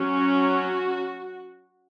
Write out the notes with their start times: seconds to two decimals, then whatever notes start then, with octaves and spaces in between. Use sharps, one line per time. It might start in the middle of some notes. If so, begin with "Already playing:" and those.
Already playing: F#3 C#4
0.16 F#4